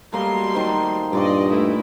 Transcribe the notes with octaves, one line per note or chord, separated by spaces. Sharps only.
F#3 G3 A3 A#3 D#5 C6
D#3 C5
G2 A#2 D5 D#5 C6 C#6
A3 E4 D#5